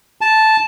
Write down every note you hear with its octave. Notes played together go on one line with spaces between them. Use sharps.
A5